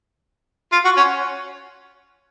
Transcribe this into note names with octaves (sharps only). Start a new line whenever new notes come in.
F4
F#4
C#4